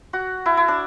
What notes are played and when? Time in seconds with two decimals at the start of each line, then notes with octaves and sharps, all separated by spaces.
0.13 F#4
0.46 E4
0.57 E4
0.68 D4